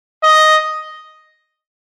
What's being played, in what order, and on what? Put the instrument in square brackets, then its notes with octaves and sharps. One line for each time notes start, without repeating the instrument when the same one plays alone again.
[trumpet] D#5